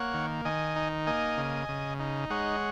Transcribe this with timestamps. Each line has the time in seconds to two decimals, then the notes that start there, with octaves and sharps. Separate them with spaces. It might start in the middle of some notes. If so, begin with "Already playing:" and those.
Already playing: A#3 C#5 F#5
0.14 D#3
0.45 D#3 D#5 G#5
0.76 D#4
1.07 A#3 D#5 G#5
1.37 C#3
1.69 C#3
2.00 D#4
2.30 G#3 C#5 F#5